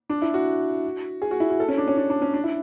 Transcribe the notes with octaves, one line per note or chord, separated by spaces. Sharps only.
D4
E4
F#4
G#4
F#4
E4
F#4
A4
C#4
D4
C#4
D4
D4
C#4
D4
E4